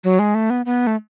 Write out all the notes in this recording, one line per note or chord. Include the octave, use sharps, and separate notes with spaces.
F#3
G#3
A3
B3
B3
A3